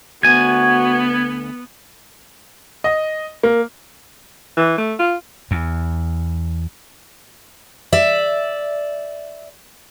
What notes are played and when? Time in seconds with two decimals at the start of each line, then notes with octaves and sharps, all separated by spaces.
0.23 D2 B3 F#4 G#5 G#6
2.84 D#5
3.43 A#3
4.57 E3
4.78 A3
4.99 F4
5.51 E2
7.92 D5 E5